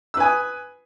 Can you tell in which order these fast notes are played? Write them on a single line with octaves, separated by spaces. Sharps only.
E6 B4 G#5 D#6